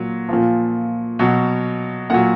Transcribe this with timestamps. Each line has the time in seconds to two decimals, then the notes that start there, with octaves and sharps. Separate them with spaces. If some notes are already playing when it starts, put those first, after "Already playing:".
Already playing: A#2 F#3
0.29 A#2 F3
1.19 B2 F#3
2.10 A#2 F#3 F#5